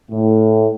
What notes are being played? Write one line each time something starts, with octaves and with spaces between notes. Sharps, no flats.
A2